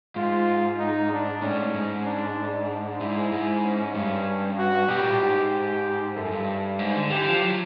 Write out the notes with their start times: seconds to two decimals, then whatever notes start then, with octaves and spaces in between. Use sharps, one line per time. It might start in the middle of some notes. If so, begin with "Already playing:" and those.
0.16 G#2 F4
0.79 D#4
1.12 D4
1.42 A2 C#4
1.58 G#2
1.75 G#2
2.06 D4
2.69 D4
3.00 G#2 E4
3.32 G#2
3.64 C#4
3.95 G2
4.58 F#4
4.88 B2 G4
4.99 A#2
5.10 A2
5.21 G#2
5.52 G4
6.16 F#2 A4
6.32 G2
6.79 G#2
6.95 D3
7.10 E3 G4
7.26 F3
7.42 F#3